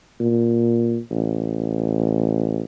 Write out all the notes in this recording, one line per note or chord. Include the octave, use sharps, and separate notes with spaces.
A#2
A1